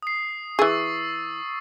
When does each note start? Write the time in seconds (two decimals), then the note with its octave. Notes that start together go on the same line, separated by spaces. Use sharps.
0.03 D#6 C7
0.59 E3 G#4 C#6 E6 A6